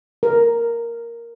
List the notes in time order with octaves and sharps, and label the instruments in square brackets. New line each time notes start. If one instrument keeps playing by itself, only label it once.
[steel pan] A#4